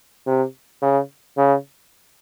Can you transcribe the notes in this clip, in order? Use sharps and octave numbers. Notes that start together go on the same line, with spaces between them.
C3
C#3
C#3